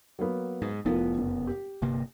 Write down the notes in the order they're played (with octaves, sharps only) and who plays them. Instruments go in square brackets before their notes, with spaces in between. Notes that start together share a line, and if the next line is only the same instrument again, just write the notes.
[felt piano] F#3 A#3 B3
[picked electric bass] G#2
[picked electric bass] F1 B3 [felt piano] A2 F3 A#4
[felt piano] F#1
G4
[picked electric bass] G1 C3 A#3